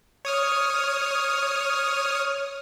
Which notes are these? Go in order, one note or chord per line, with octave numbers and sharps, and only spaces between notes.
C#5 D#6 F6